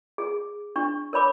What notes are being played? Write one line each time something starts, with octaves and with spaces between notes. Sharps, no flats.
G#4
D4 C#6
A#4 C#5 B5 D6